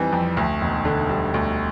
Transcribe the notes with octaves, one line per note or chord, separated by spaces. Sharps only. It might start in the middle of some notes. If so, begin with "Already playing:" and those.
Already playing: F2 E3 G3 C4
F2
D2
E1
D3
G3
D2